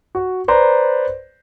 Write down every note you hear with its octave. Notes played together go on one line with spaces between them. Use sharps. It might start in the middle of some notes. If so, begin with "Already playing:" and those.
F#4
B4 C5 D5 A#5